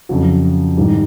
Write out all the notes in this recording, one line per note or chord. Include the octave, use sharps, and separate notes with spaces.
F2 C#3 F#3
G#2 D#3 G3